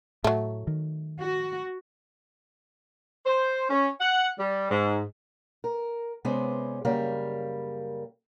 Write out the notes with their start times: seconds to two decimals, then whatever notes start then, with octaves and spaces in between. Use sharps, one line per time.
0.24 A2 F#3 A3
0.67 D#3
1.21 F#4
3.26 C5
3.69 C#4
4.00 F#5
4.38 G3
4.70 G#2
5.64 A#4
6.25 C3 G#3 B3 C#4 C5 D5
6.85 F#2 C#3 G3 A#3 A#4 F5